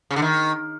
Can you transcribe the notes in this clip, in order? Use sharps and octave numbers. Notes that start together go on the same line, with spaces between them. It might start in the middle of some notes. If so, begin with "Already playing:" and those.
C#3
D3
D#3